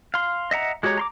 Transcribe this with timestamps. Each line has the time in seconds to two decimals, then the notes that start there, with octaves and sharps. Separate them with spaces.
0.14 F5 C6
0.51 D#5 E5 F#5 A#5
0.83 G#3 F#4 G4 C#5 A#5
0.97 A#5 C6 D6